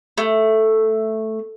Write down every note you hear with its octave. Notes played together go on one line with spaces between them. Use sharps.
A3